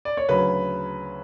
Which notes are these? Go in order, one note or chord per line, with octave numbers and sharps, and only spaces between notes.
D5
C#5
D2 C#3 F#3 B4